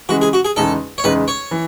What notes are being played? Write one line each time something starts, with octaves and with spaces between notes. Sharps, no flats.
C#3 E3 G#3 F#4
G#4
F#4
G#4
E2 C#3 G#3 D#4 A4
C#5
E2 C#3 G#3 D#4 B4
C#5
E3